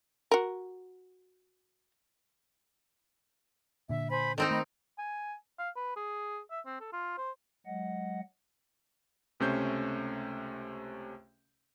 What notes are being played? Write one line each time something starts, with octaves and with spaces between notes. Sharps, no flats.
F#4 A#4
A#2 D3 E5
C5 G#5 B5
D#3 C4 D#4 A4 E6
A3 D#5 B5
G#5
F5
B4
G#4
E5
C4
A4
F4
C5
F#3 G#3 D#5 F#5
C#2 C3 A3 C#4 C5 G6